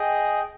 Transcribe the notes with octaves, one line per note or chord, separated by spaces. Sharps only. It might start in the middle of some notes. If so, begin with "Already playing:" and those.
Already playing: G#4 D#5 G5